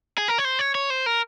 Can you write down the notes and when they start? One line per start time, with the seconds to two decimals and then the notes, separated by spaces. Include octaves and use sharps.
0.18 G#4
0.28 A#4
0.38 C#5
0.45 C5
0.59 C#5
0.75 C#5
0.90 C5
1.06 A#4